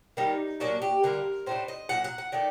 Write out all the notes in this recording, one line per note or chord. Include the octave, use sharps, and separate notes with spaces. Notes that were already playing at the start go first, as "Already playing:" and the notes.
D#3 G3 A#3 D#4
A#2 F#3 A#3 D4 F#4
G4
D3 G3 A#3 A#4
A2 A3 D4 C5
D#5
A#2 F#3 F#5
F#5
F#5
D#3 A3 D5